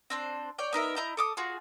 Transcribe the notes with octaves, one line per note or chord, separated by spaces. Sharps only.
C4 D4 C5
C#5 D5 G5
B3 D#4 A#4 E5
E4 D#5 A#5 G6
A4 D6 D#6
F4 F#4 G#4